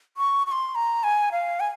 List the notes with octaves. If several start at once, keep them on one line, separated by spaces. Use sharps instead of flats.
C#6
C#6
C6
A#5
G#5
F5
G#5